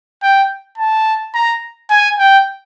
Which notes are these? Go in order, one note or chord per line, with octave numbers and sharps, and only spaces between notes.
G5
A5
A#5
G#5
G5